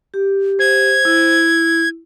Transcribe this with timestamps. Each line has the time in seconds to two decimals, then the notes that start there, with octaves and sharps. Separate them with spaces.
0.14 G4
0.59 C5 G#6
1.05 E4